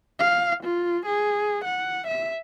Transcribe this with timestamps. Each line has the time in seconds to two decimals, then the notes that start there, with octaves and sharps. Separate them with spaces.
0.19 F5
0.64 F4
1.06 G#4
1.65 F#5
2.07 E5